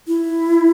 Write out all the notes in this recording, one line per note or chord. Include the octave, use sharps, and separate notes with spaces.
E4